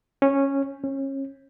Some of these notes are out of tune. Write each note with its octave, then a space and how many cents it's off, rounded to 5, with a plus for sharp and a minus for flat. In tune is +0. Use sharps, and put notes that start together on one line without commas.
C#4 -10
C#4 -30